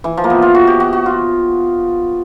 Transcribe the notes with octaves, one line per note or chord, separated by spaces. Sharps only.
E3
F3
A#3
B3
F4
F#4
G4
F#4
F#4
F4